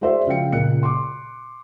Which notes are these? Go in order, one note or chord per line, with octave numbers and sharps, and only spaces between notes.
G#3 E4 F#4 C5 D5 E5
C#3 F3 F5 G5 C#7
C#2 A#2 F#6 C#7
C6 D6